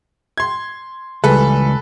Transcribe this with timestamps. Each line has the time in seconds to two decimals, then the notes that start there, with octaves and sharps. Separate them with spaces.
0.38 C6 G#6
1.24 C#2 A#2 E3 G3 A4 B4